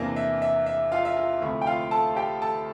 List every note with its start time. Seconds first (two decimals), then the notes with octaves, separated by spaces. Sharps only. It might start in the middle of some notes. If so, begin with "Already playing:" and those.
Already playing: E2 C3 E3 A#3 D4
0.16 E5
0.42 E5
0.66 E5
0.92 F4 F5
1.05 E5
1.16 F4 F5
1.41 D2 C3 F3 A3 E4 E5
1.61 G5
1.66 F4 F5
1.91 A4 A5
2.16 G4 G5
2.42 A4 A5